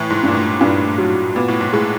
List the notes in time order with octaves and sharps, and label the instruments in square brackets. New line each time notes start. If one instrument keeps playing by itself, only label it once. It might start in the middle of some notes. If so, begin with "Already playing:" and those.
Already playing: [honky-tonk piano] A2 [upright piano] E3
[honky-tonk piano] G#2
[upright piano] G2 [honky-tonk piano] A#2
[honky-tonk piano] A2
[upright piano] G2 [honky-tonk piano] A#2
[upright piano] F#3
[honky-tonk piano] A#2 [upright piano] B3
[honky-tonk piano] A2
G#2
[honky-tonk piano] A2 [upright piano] G#3